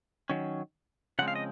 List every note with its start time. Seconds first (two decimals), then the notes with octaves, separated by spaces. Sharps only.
0.29 D#3 F#3 C#4
1.19 C#3 F3 G#3 C4 F#5
1.28 F5
1.36 D#5